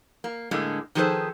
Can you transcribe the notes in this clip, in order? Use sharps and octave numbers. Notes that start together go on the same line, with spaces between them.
A#3
A2 D3 G#3 A#3
D#3 F3 G#4 A4 B4 C5